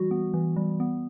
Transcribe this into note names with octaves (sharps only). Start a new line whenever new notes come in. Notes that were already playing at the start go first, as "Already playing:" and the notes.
Already playing: E3 G3 F#4
B3
E3
G3
B3